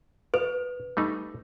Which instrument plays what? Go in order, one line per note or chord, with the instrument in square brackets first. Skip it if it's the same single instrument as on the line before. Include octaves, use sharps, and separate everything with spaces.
[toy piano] B4 [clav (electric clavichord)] D5
[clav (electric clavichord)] G3 A3 D#4